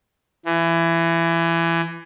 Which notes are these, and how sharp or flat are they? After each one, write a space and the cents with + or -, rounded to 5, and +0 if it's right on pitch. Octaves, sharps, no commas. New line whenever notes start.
E3 +20